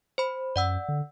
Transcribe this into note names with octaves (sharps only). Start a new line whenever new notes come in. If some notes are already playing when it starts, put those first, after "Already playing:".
C5 B5
F#2 D5 F#5 E6
D3